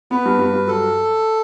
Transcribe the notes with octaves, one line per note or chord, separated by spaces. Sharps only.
B3 B4
G2
G2
G2
F#3 A4